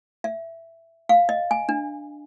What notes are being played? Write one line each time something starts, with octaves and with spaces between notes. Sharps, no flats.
E5
F5
D#5
G#5
D4